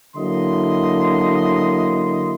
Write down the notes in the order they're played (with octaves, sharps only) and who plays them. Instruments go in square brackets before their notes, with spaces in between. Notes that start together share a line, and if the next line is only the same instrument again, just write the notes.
[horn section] D3 F#3 A#3 E4 D#5 C6